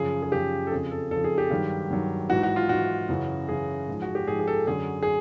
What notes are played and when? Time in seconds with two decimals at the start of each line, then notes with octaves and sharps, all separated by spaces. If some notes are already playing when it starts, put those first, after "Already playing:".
Already playing: F#2 C#3 F3 G#4
0.23 G#4
0.32 F#2 C#3 F3 G4
0.67 A4
0.72 F2 C#3 F3 G#4
0.91 A4
1.11 F2 C#3 F3 A4
1.24 G#4
1.38 G4
1.50 G2 D#3 F#3
1.90 G2 D#3 F#3
2.30 G#2 E3 F#4
2.43 F#4
2.56 F4
2.69 G#2 E3 F#4
3.09 F#2 C#3 E3
3.48 F#2 C#3 E3 G#4
3.88 G#2 F3
4.02 F#4
4.15 G4
4.28 G#2 F3 G#4
4.39 G#4
4.47 A4
4.67 F#2 D3 F#3 G#4
5.03 G#4